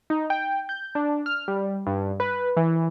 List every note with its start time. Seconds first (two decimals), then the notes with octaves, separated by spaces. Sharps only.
0.10 D#4
0.30 G5
0.69 G6
0.95 D4
1.26 F6
1.48 G3
1.87 G2
2.20 B4
2.57 E3